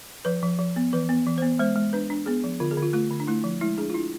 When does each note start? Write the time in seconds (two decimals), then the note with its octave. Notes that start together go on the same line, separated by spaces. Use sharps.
0.25 F3 B4
0.43 F3
0.59 F3
0.76 B3
0.93 E3 B4
1.09 B3
1.27 E3
1.38 C5
1.42 B3
1.59 G#3 C5
1.76 G#3
1.93 D4 B4
2.10 D4
2.26 B3 G#4
2.44 F3
2.60 D3 F4
2.71 G#4
2.77 D3
2.82 F4
2.93 A3 F4
3.11 D3
3.20 D4
3.28 A3 E4
3.44 F3
3.61 G#3 E4
3.78 D4 G#4
3.90 F4
3.94 D4 E4